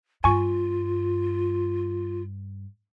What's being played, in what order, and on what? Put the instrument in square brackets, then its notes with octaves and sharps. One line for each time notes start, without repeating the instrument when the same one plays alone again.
[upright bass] G2 [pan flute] F4 [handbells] G#5 C#6